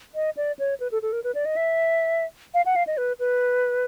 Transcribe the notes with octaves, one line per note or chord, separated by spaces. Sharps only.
D#5
D5
C#5
B4
A4
A4
A#4
B4
D5
D#5
E5
F5
F#5
F5
D#5
B4
B4